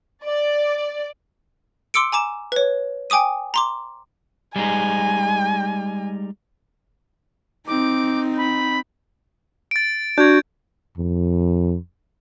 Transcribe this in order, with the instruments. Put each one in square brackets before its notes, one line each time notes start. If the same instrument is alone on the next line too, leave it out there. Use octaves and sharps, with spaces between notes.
[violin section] D5
[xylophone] C6 D6 E6 C#7 D7
G#5 A#5 D6 E7
B4 C#5
G5 G#5 D6 D#6 D#7
A#5 C6 D6
[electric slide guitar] G3 G#3 D#4 [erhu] G#5
[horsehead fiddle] C4 D#4 [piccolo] D6
[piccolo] B5
[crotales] A6 D7
[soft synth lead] D4 [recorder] F#4 [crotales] G6 G#6
[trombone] F2